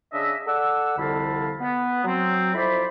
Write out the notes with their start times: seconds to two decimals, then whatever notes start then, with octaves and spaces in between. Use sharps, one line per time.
0.12 C#3 D4 G#4 D#5 E5
0.47 A4 D5 F#5 E6
0.98 C2 F2 D3 F5 A5 B5
1.61 B3
2.04 F#3 C4
2.54 F2 E4 C5 D5 B5